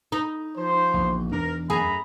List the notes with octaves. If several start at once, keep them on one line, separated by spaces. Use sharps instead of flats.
D#4
F3 C5
A#1 E2
E2 D4 A#4
F#2 G#4 A#5 B5